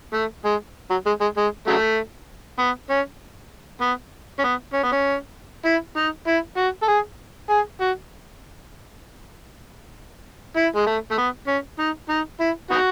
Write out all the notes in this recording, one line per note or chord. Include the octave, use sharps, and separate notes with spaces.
A3
G#3
F#3
G#3
G#3
G#3
C#3 F#3 A3
B3
C#4
B3
C#4
B3
C#4
B3
C#4
E4
D#4
E4
F#4
A4
G#4
G#4
F#4
E4
G#3
A3
A3
B3
C#4
D#4
D#4
E4
B3 D#4 F#4